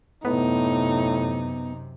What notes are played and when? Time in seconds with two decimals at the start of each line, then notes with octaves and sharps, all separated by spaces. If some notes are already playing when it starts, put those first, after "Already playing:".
0.25 F#2 A2 C3 B3 D#4